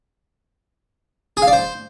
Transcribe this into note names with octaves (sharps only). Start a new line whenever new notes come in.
G#4
F5
D5
C5